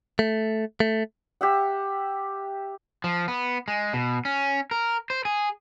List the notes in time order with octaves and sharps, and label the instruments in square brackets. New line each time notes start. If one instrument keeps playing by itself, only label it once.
[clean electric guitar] A3
A3
[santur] G4 E5 F#5
[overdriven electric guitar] F3
B3
G#3
B2
C#4
A#4
C5
G#4